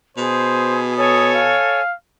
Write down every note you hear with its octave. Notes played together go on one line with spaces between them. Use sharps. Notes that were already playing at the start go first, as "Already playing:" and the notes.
B2 G#4 C5
A4 C#5 G#5 D#6
F5